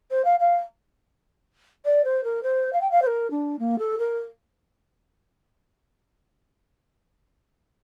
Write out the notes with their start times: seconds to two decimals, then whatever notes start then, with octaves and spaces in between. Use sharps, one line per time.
0.11 C5
0.25 F5
0.40 F5
1.85 D5
2.04 C5
2.24 A#4
2.43 C5
2.73 F5
2.81 G5
2.91 F5
3.02 C5
3.07 A#4
3.31 D4
3.59 A#3
3.79 A4
3.99 A#4